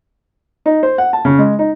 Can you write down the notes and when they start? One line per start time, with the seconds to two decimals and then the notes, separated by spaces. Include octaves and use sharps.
0.66 D#4
0.83 C5
0.98 F#5
1.13 A5
1.25 C#3
1.39 G#3
1.59 D#4